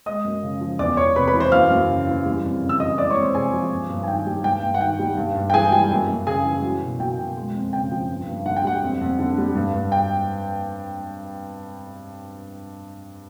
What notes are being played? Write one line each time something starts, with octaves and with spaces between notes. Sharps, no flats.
G#3 D#5 D#6
F#2
C#3
F3
E2 D5 D6
E2 C#5 C#6
C3 B4 B5
B4 B5
E3
C5 C6
F#2 F5 F6
F#2
C#3
E3
G3
F2
C#3
E6
E3 D#5 D#6
G#3 D5 D6
C#5 C#6
F2
C5 C6
C3 G#4 G#5
F3
G2
G2
G#5
D#3 G5
G3
G2 G5
G2
F#5
D#3 G5
G3
G2
G2
G5
E3 G#4 G#5
G3 G5
F#2
F#2
C#3 G#4 G#5
E3
F#3
B2
F#3 G5
B2
G#3
F2
C#3 G5
F3
G2
G2
D3 F#5
G5
G3 F#5
F2
F2
D3
G3
G2
G2
G5